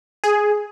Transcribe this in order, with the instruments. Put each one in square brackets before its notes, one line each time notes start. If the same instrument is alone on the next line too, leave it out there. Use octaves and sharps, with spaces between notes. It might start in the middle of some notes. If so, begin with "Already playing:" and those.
[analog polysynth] G#4